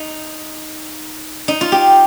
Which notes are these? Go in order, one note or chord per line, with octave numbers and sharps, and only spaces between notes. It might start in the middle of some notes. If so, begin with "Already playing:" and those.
Already playing: D#4
D#4
F4
G4